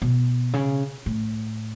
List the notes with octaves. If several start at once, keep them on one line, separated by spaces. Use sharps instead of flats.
B2
C#3
A2